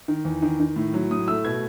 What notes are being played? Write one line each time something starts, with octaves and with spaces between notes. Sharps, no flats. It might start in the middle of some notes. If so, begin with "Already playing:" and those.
D#3
E2
D#3
D#3
A2
F#3
A2 D#6
A3 E6
B2 G#6